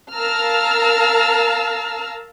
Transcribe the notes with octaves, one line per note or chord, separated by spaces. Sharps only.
A#4 F5 A5 A#5 E6 F6